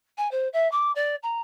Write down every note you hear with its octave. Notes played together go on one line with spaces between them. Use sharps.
G#5
C5
E5
D6
D5
A#5